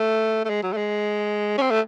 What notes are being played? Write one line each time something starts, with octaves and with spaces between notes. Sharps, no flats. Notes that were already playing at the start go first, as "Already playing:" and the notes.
Already playing: A3
A3
G#3
F#3
A3
G#3
C#4
C4
A3